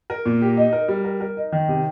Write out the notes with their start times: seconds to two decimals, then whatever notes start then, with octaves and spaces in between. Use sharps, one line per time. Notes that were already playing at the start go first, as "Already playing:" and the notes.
0.10 A#4
0.26 A#2
0.41 G4
0.57 D#4
0.73 A#4
0.88 G3
1.05 A#4
1.20 A#4
1.37 D#4
1.52 D#3
1.68 C3